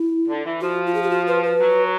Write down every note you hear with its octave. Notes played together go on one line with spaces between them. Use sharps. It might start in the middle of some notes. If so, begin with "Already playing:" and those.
Already playing: E4
D3
E3
F3 F#4
F4
G#4
G4
F#4
B4
B4
F#3